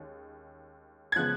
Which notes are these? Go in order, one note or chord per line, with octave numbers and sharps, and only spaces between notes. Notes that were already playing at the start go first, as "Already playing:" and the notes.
Already playing: D#2 G#3 C#4
G#6
C#3 F3 G#3 B3 F#6